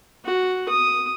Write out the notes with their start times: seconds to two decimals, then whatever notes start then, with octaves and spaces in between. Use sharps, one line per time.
0.25 F#4
0.69 D#6